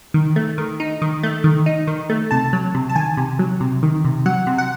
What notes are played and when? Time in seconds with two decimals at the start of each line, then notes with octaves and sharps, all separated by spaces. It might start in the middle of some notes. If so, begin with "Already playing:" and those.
0.14 D#3
0.36 A3
0.58 D#3
0.80 D#4
1.02 D#3
1.23 A3
1.44 D#3
1.66 D#4
1.87 D#3
2.10 A3
2.31 C3 A5
2.53 F#3
2.74 C3
2.90 A5
2.96 D#3 G#5
3.17 C3
3.39 F#3
3.60 C3
3.83 D#3
4.05 C3
4.26 F#3 F#5
4.47 C3
4.58 F#5